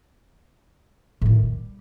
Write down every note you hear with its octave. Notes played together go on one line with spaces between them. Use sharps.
A2 D#3
G3